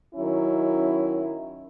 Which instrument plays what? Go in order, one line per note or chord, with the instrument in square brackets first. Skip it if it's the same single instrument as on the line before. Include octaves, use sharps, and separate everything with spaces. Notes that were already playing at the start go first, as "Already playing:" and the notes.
[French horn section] D#3 F#3 C#4 E4